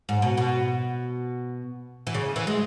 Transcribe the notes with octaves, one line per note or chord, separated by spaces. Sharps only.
G#2
B2
B2
E3
C#3
E3
G#3